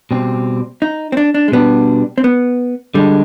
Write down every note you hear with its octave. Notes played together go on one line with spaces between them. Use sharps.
B2 G3 C4
D#4
C4
D4
D4
G#3
B2 G3 B3 D4
C4
B3
D3 G3 G#3 D4